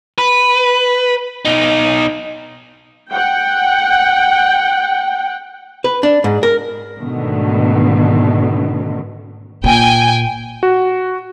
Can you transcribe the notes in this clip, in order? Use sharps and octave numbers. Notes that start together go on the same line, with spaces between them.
B4
B2 D#4
F#5 G5
B4
D4
G#2
A#4
G#2 B2 D3 D#3 A3
A#2 G5 G#5
F#4